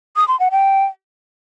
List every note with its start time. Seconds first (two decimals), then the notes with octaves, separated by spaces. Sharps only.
0.16 D#6
0.28 C6
0.40 F#5
0.51 G5